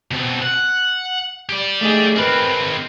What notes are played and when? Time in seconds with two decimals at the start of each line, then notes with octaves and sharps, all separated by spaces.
0.11 B2 C4
0.42 F#5
1.49 G4 D5
1.81 A3 D#4 G#4
2.16 G#2 C4 A#4 B4